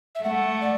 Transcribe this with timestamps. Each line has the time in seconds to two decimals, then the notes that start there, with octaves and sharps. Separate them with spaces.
0.15 E5
0.23 A3 F#5
0.61 D5